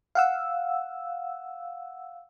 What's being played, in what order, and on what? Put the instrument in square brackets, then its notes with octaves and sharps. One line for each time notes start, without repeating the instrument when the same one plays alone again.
[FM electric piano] F5 F#5 E6